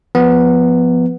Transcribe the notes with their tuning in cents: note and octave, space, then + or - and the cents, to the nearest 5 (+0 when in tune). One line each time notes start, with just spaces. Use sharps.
F3 +0 B3 +0